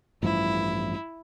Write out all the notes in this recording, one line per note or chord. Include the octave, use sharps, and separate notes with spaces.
A1 G2 F3 E4